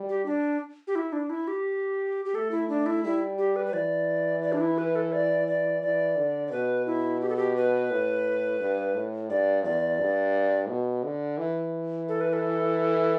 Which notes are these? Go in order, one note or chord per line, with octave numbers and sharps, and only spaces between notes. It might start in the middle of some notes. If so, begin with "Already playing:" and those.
Already playing: G3
G4
D4
G4
E4
D4
E4
G4
G4
A3 A4
E4
D4
E4
G3 E4
G4
B4
B4
E3 D5
D5
D4
E4
B4
A4
D5
D5
E3 D5
D3
D5
B2 B4
E4
G4
A4
G4
B4
A2
G2
A2
G2 D5
E2 D5
G2
B2
D3
E3
A4
B4
A4